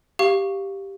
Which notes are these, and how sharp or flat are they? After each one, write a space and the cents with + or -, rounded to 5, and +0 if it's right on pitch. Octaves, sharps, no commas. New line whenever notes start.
G4 +0 F5 +0 C#6 +0